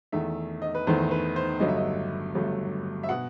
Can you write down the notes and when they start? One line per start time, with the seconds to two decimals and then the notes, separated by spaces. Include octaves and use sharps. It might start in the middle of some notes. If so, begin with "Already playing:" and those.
0.12 E2 D#3 A3 E5
0.62 D#5
0.75 B4
0.87 E2 D#3 A3 C5
1.11 B4
1.36 C5
1.60 G1 G2 F#3 A3 D#5
1.68 E5
1.76 D#5
2.35 G1 G2 F#3 A3
3.03 E5
3.09 B2 F#5